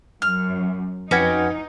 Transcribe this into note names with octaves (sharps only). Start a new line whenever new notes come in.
F#2 F6
F2 C#4 D#4 F#4 G4 B4 G#6